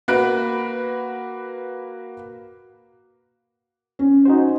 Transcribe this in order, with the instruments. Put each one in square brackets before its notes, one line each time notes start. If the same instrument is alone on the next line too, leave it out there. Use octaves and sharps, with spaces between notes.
[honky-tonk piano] A#3 F#4 B4 F#6 D7
[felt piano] C#4
[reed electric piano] D#4 F#4 C5